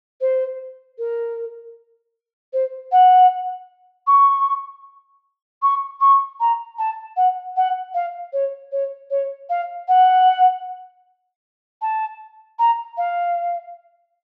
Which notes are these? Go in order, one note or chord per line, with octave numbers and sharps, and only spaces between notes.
C5
A#4
C5
F#5
C#6
C#6
C#6
A#5
A5
F#5
F#5
F5
C#5
C#5
C#5
F5
F#5
A5
A#5
F5